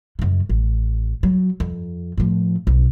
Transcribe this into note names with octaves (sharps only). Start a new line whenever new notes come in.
F#2 C#3
A1
F#3
F2
A2 F3
B1